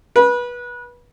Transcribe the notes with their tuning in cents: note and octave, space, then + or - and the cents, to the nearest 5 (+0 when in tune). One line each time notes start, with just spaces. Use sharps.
B4 -25